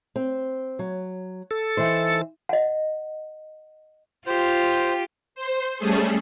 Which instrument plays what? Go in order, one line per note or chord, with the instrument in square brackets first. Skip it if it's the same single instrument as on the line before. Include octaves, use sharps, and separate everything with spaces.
[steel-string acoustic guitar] C4
F#3
[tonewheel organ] A4
[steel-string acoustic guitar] E3 D#4 C5
[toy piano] D#5 F#5
[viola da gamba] F4 [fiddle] G4 [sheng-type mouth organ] C5
[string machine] C5
G3 A3 C#4 G#4 A4